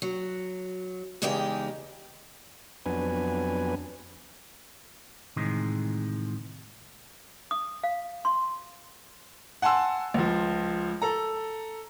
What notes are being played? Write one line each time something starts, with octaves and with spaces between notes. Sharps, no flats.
F#3
E2 C#3 G#3 D#4 G4 G5
F2 F#3 B3 D4 B4 G#5
A2 C3 D#3 E3 G#3
D#6
F5
C6
F#5 G#5 A5 C6 E6
C#2 F3
A4 A#5